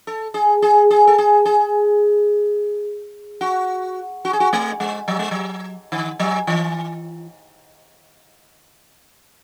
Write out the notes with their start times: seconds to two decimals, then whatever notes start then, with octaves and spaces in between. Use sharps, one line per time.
0.07 A4
0.34 G#4
0.62 G#4
0.91 G#4
1.07 A4
1.18 G#4
1.45 G#4
3.41 F#4
4.25 F#4
4.33 G#4
4.40 F#4
4.53 A3
4.80 G#3
5.08 F#3
5.19 G#3
5.31 F#3
5.92 D#3
6.20 F#3
6.47 E3